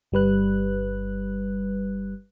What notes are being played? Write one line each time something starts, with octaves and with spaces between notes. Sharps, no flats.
G1 G3 B4 F#6